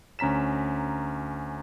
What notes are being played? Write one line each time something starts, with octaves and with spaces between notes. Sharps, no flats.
D2 C#4 A#5 B6 E7